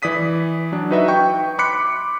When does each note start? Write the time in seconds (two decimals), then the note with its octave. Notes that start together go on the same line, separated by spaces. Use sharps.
0.02 E3 D5 D#6 B6 D#7
0.72 F#3 D4
0.91 D#4 F#4 B4 D#5 E5
1.08 G5 C#6 G6
1.58 B5 C6 D6 F#6 B6 C#7